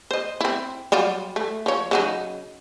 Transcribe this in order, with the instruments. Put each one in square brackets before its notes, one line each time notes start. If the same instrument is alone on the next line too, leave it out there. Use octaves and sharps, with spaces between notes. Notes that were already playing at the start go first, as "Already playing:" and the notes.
[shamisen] C5 D#5
C4 E4
F#3 G3 F4
A3
F3 C#5
C#3 F#3 D#4